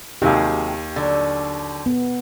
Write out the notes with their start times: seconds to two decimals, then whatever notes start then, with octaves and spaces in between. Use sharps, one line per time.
0.22 D#2 C3 D#3 F#3 G4 G#4 F5
0.96 D3 F#3
1.86 B3